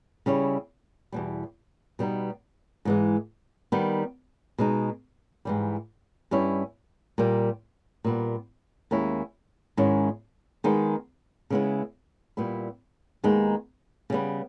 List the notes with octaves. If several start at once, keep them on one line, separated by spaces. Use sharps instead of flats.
C#3 G3 C#4 E4
E2 B2 G3
B2 G3 B3 D#4
G#2 E3 G#3
D#3 G3 B3 D#4
B2 G#3 D#4
G#2 E3 G3
G2 G3 C#4 E4
A#2 G3 A#3
A#2 G3 B3
D#2 D#3 G#3 C#4 E4
G#2 D#3 G#3 C#4 E4
D#3 G#3 B3 D#4
C#3 G#3 B3 E4
A#2 G3 B3 E4
D#2 D#3 G#3 B3 D#4
C#3 G3 B3